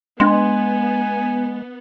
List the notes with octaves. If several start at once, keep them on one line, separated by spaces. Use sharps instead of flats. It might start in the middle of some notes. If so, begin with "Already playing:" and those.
G#3 B3 D4 G#5 C6